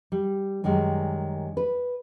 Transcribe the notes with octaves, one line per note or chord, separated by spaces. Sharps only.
G3
F#2 D#3 G3 G#3
B4